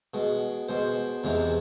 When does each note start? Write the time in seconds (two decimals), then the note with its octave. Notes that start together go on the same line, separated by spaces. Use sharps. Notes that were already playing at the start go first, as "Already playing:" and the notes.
0.14 B2 G#3
0.69 B2 G#3 C5
1.24 E2 C3 E3 G#3